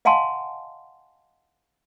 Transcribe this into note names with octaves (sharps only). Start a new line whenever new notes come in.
D#5 F5 F#5 G#5 A5 C6